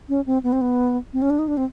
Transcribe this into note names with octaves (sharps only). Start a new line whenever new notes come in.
C#4
C4
B3
C4
B3
C4
C#4
D4
D#4
D4
C4